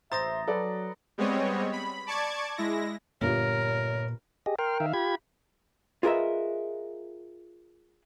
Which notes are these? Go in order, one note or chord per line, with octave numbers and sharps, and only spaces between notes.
A1 C5 E5 A#5 D#6 A6 A#6
F#3 A4 B4 D5
G3 G#3 B3 C4 C#5 D#5
B5
D5 A5 C#6 D6 G#6
G#3 E4 A#6
G1 A#2 F4 G4 A#4 C#5
G4 G#4 D#5
A#4 G5 C6 F6
D#3 E5 F5
F4 G4 B5 G#6
F4 G#4 A#4 B4 D#5 E5